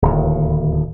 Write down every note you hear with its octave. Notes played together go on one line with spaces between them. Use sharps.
D1 D#2